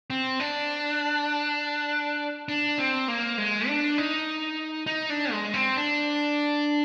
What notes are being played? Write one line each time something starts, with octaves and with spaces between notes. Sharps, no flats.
C4
D4
D4
C4
A#3
G#3
D4
D#4
D#4
D4
G#3
C4
D4